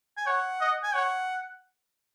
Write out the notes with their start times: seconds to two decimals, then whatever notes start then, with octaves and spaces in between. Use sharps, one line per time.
0.17 G#5
0.27 C#5 F#5
0.61 D#5
0.83 G#5
0.94 C#5 F#5